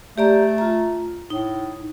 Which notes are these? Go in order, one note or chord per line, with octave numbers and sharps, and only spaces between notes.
A3 G4 D5 A#5
F4 A#5
A2 D#4